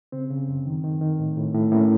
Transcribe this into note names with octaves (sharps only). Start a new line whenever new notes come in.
C#3 C4
C#3
F#2
D#3
D#3
D#3
A2
A2
A2
A2 A#3 C#4